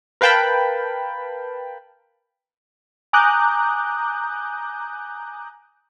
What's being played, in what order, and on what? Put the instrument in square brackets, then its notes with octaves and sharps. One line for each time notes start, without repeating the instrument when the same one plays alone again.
[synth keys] A#4 B4 F5 G5 A5 B5
G#5 A#5 D6 D#6 F#6 G6